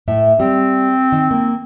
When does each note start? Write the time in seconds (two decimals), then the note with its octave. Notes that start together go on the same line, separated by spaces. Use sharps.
0.08 A2 A3 E5
0.40 G3 C4
1.12 D#3
1.31 A#3